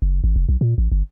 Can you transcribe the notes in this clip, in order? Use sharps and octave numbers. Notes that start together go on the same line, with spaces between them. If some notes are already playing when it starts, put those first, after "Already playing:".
F#1
G#1
F1
B1
A#2
A1
G1